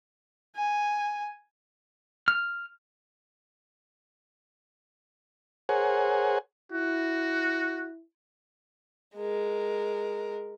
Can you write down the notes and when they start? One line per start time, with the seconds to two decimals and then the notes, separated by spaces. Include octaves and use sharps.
0.56 G#5
2.28 F6
5.69 G#4 A#4 C5 C#5 F#5 G#5
6.72 E4 F#4
9.16 G#3 A#4